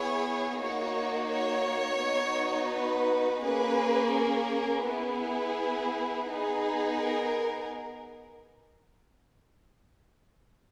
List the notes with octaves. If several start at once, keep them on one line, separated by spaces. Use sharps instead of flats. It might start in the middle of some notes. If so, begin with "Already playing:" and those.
Already playing: B3 E4 G#4 C#5
A#3 D#4 F#4 C#5
C#5
B3 D#4 F#4
B4
A#3 C#4 G#4 B4
A#4
B3 E4 G#4 B4
B3 D#4 G#4
A#4